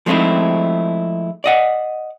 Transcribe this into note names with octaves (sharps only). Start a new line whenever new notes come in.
F3 G#3 A3 C4 D#4 E4
D5 D#5 F#5